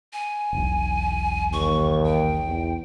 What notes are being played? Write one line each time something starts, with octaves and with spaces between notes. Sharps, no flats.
G#5
E1 B1
D#2 C#6
G5
E2